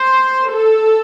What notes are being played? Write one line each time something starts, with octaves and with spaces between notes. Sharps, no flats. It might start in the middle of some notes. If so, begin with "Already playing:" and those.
Already playing: C5
A4